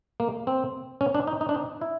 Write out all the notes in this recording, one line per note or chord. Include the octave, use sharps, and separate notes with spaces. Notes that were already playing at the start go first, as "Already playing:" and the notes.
A#3
C4
C#4
D4
D#4
D#4
D4
D#4
E4